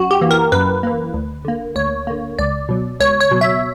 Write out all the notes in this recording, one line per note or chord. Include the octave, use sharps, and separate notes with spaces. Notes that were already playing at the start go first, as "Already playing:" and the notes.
Already playing: F#2 F#4
G4
E3 A#3
A#4
F#2 B4
E3 A#3
D2
D3 A#3
D2 C#5
D3 A#3
C#2 D5
B2 F#3
C#2 C#5
C#5
B2 F#3
E5